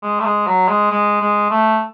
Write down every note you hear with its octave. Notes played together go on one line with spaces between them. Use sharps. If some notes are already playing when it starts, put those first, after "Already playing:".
G#3
A3
G#3
F#3
G#3
G#3
G#3
A3